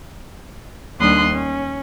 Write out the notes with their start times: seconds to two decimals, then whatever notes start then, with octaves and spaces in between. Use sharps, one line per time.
1.00 D#2 G3 D4 C6 D#6 F#6
1.30 C#4